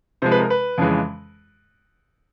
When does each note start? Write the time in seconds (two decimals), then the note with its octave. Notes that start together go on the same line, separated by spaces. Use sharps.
0.22 C3 F3 G#3 C5
0.32 B4
0.40 A#4
0.50 B4
0.78 F2 C#3 E3 G#3